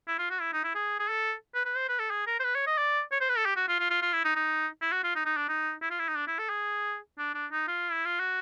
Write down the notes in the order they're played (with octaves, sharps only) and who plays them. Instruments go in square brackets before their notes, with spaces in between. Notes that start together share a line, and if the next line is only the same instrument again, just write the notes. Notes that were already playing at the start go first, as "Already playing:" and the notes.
[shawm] E4
F4
F#4
E4
D#4
E4
G#4
G#4
A4
B4
B4
C5
B4
A4
G#4
A#4
C5
B4
C#5
D#5
D5
C#5
C5
B4
A4
G4
F#4
F4
F4
F4
F4
E4
D#4
D#4
E4
F#4
F4
D#4
D#4
D4
D#4
E4
F4
E4
D#4
D4
E4
A4
G#4
D4
D4
D#4
F4
E4
F4
F#4